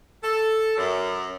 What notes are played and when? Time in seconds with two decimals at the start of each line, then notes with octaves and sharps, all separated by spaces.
0.22 A4
0.76 F#2